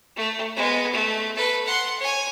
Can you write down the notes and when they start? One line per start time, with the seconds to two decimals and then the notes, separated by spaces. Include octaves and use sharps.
0.16 A3
0.56 G#3 B3
0.93 A3
1.36 A4 B4
1.66 F#5 C6
1.99 C#5 G#5